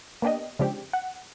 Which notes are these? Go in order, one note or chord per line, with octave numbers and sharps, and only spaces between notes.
A#3 B3 D4 G4 D#5
C#3 F3 G#3 C4 D4 G4
F#5